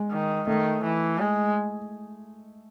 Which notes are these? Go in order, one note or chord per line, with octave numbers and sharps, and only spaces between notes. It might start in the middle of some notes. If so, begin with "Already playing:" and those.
Already playing: G#3
D#3
D#3 A3
E3
G#3